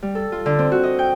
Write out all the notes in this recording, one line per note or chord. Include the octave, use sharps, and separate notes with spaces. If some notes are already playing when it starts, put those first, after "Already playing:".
G3
A4
F4
D3
C4
F#4
D#5
G5